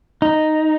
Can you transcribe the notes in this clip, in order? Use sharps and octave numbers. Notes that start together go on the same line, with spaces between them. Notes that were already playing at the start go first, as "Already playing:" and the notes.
D#4